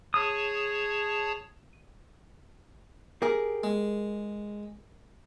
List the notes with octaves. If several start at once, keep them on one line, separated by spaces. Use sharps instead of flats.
G#4 C#5 A5 D#6
G4 G#4 A#4
G#3